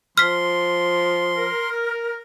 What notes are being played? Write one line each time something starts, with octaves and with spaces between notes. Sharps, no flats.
F3 C6 F6 B6
A#4